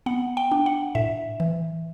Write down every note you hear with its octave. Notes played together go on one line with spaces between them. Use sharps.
B3 F#5
G5
D4
F#5
A2 E5
E3